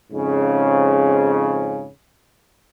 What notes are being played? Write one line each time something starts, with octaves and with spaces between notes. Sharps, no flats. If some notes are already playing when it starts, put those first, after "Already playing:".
F2 G#2 C#3